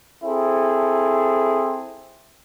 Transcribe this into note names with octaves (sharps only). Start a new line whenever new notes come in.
C4 E4 G#4 A4